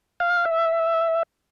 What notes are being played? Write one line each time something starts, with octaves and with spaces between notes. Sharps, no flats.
F5
E5